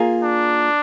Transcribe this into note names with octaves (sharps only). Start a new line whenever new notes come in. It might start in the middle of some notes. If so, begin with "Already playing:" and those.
Already playing: A#3 F4 G#4
D4